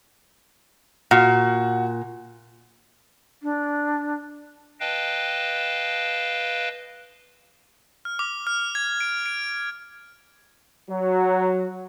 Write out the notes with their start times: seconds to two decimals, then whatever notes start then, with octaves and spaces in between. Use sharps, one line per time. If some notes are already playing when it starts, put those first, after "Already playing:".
1.11 A#2 F#4
3.43 D4
4.80 B4 D#5 F5 G5 A5
8.05 F6
8.19 D6
8.47 F6
8.75 G#6
9.00 D7
9.26 D7
10.89 F#3